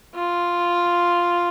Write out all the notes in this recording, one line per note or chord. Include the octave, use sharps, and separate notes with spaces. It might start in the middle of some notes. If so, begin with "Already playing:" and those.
F4